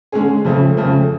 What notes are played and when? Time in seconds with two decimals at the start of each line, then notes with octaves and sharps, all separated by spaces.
0.12 D3 G#3 C#4 G#4
0.45 F2 C#3 F3 A3
0.77 F2 C#3 F3 A3